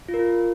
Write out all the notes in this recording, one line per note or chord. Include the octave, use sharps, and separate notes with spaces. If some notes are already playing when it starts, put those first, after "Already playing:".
F4
A#4
F4